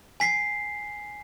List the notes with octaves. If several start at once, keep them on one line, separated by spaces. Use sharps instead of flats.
G#5 B6 C7